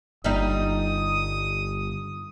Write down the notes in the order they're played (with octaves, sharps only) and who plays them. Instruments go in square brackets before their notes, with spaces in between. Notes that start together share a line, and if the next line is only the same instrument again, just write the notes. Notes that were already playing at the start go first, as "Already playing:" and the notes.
[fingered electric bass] G1 [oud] G3 D#4 [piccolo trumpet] D#6